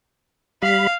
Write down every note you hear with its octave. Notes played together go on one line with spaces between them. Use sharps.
G3 F5 B5